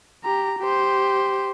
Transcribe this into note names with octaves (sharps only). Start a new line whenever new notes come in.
G4 A#5
G4 C5